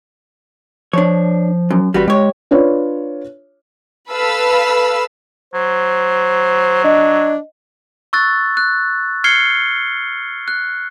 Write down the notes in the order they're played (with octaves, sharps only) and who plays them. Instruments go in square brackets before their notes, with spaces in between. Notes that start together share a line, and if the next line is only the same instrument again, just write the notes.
[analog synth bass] F3 [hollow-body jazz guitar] D4 C#5
[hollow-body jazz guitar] F#2
[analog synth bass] A1 [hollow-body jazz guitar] G3 F#4 B4
[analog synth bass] G#3 [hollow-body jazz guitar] G4 C#5
[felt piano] D4 F4 B4 C#5 D5
[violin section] A4 B4 F5 B5 E6
[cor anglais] F#3 [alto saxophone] C5
[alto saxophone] D4 [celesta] D#5
[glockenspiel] C#6 E6 F#6 A6
F#6
F6 G#6 C7 C#7 G7
F#6